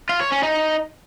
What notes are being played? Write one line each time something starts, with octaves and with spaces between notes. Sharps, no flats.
F4
C#5
C#4
D#4